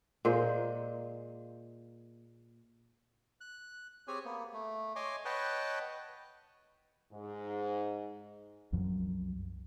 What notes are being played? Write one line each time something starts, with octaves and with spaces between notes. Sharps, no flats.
A#2 G#3 A#3 C5
F#6
C4 G4 G#4 C#5 G#5
A#3 B3
A3
C#5 D#5 G#5 C6 D6
B4 C#5 D#5 F#5 G5 A5
G#2
C2 F#2 F3 F#3